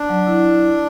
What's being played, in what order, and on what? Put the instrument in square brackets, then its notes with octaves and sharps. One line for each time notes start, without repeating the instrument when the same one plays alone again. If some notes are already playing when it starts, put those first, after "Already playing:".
Already playing: [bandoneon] D4
[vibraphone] F#3
E4